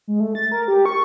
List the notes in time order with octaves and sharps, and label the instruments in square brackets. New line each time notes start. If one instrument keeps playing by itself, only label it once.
[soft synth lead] G#3
A3
A6
A#4
G4
C#6